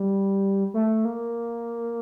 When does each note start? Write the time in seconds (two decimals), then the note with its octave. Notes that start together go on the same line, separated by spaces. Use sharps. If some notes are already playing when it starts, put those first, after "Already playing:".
Already playing: G3
0.74 A3
1.05 A#3